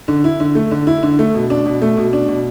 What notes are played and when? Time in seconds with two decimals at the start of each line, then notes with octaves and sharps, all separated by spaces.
0.08 D3
0.24 E4
0.40 D3
0.55 A3
0.71 D3
0.87 E4
1.03 D3
1.19 A3
1.34 B2
1.50 D4
1.66 B2
1.82 A3
1.97 B2
2.13 D4
2.28 B2